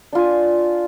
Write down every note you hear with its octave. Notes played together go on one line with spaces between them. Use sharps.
D4 F4 G#5